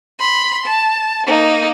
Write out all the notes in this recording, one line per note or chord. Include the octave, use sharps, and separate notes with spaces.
B5 C6
A5
A#3 D#4